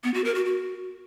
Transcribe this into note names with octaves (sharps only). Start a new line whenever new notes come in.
B3
F#4
A#4
F#4
F#4